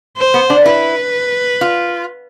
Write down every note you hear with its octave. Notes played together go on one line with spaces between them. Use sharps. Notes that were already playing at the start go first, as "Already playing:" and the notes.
C5
B3
D4
E4 B4
F4